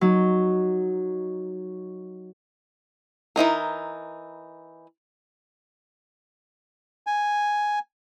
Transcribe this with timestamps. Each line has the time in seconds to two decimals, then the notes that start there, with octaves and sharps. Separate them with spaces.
0.01 F#3 D#4
3.36 E3 F3 D#4 A#4
7.07 G#5